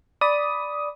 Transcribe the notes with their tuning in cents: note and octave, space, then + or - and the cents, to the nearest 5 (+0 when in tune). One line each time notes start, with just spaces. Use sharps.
D5 +0 B5 +0 D#6 +10